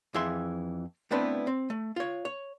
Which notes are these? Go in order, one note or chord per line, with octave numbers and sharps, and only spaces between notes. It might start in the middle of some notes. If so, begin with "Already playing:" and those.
F2 E3 G#4 E5 C6
A3 B3 C4 D4 E4 B4
C4
A3
F4 C#5
C#5